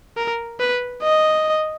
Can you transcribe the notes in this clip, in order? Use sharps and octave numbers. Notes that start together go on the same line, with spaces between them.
A#4
B4
D#5